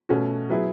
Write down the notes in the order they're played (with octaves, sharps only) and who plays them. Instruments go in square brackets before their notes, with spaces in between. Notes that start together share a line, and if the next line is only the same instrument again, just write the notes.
[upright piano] B2 A3 C#4 F#4
F#3 B3 E4 G#4